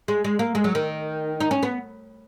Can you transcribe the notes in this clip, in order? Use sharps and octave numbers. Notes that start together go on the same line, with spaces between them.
G#3
G#3
A#3
G#3
F#3
D#3
D#4
C#4
B3